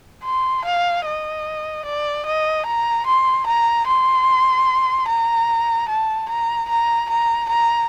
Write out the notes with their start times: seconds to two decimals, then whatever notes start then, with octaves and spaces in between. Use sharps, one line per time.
0.24 C6
0.64 F5
1.05 D#5
1.85 D5
2.26 D#5
2.66 A#5
3.06 C6
3.46 A#5
3.87 C6
5.08 A#5
5.88 A5
6.29 A#5
6.69 A#5
7.09 A#5
7.49 A#5